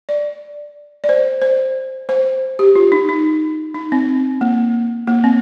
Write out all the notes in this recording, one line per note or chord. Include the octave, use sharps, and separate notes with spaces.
D5
D5
C5
C5
C5
G4
F4
D#4
D#4
D#4
C4
A#3
A#3
C4